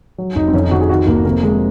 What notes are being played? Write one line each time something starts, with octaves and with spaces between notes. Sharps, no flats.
F#3
F1 D#4
C4
F2 C#4
D#4
F2 F#4
G#4
D#3 F#4
F1 A#3
C3 A#3
C3 G#3